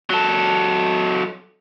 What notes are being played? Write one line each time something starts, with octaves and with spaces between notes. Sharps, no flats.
F#3 A4